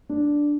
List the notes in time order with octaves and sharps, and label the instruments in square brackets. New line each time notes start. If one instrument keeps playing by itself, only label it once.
[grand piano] D4